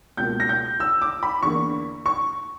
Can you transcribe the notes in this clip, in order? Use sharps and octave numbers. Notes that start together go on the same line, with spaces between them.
C#2 B2 A#3 G6
A#6
G6
E6
D6
B5
E2 D3 A#3 C#6
C#6